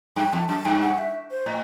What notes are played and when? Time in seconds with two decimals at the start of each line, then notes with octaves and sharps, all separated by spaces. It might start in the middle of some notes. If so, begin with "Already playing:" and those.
0.16 G2 G5
0.33 E2 A5
0.49 F#2 A5
0.65 G2 G5
0.81 F#5
0.98 E5
1.31 C5
1.46 A2 D#5